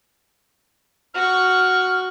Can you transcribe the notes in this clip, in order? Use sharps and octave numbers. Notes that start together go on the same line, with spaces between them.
F#4 C#6 F6